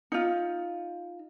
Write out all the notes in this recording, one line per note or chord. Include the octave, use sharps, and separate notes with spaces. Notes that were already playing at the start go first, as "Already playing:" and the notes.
D#4 F4